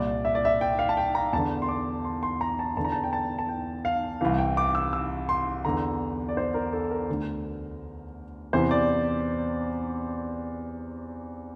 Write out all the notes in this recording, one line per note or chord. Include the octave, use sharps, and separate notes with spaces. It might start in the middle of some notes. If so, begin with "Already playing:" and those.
Already playing: C2 A#2 D5
E5
D5
E5
G5
F5
A5
G5
A#5
E2 D3 A5
C6
D6
C6
C6
A#5
A5
E2 D3 A5
A#5
A5
G5
A5
A5
G5
F5
C2 C3 E3 F5
G5
D6
E6
E6
C6
E2 D3 A#5
D5
C5
A#4
A4
A#4
D2 D3
E2 C3 E3 C5
D5